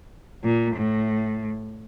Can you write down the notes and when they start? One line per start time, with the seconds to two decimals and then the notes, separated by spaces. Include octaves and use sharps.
0.44 A#2
0.76 A2